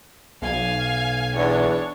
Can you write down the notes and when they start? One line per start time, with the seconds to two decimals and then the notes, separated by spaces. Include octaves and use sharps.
0.42 B1 F5 G#5
1.35 E2 D4 C#5